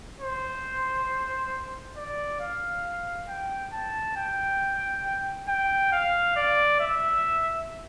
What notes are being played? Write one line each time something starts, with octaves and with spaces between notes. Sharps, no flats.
C5
D5
F5
G5
A5
G5
G5
F5
D5
E5